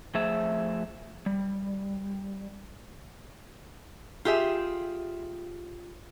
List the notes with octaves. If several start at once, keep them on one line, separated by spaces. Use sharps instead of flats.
F3 A3 G#4 C5 E5
G3
F4 G4 G#4 E5